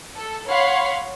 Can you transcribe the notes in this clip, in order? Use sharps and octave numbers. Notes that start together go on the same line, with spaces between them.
A4
C#5 F5 F#5 B5 C6